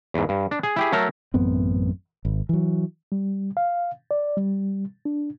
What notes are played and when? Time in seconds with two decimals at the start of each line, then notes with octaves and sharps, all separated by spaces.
0.14 E2 G#2
0.29 G2
0.51 D4
0.63 G#4
0.76 E4 G4 G#4
0.92 F#3 A3 A4 A#4 A#5
1.34 A1 F#2 B3 C4
2.25 G#1
2.49 E3 F#3
3.12 G3
3.57 F5
4.11 D5
4.37 G3
5.05 D4